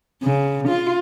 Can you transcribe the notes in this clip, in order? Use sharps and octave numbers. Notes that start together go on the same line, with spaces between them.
C#3
F4